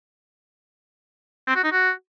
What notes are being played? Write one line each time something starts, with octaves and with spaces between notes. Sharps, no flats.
C4
F#4
D#4
F#4